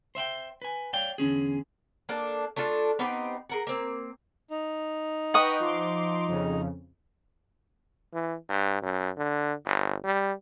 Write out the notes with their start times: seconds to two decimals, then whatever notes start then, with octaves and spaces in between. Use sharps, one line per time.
0.15 C5 E5 F#5 G5
0.62 B4 G#5
0.93 C#5 D5 F5 G5
1.18 E2 D3 C#4 G#4
2.09 A#3 D4 A4
2.56 A3 D4 F4 A4
2.99 B3 C4 D#4 G4
3.49 G#4 A#4 F#5
3.67 A#3 C4
4.50 D#4
5.34 B4 D#5 F#5 G5 C#6 D#6
5.60 F3 C6 D6
6.27 F2 C#3
8.14 E3
8.49 G2
8.83 F#2
9.17 D3
9.65 G1
10.05 G3